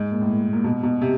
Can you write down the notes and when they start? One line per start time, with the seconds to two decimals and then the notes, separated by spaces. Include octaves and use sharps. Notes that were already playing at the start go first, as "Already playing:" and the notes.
Already playing: G#2
0.11 A#2
0.21 A2
0.30 A#2
0.53 A#2
0.64 B2
0.83 B2
1.01 C3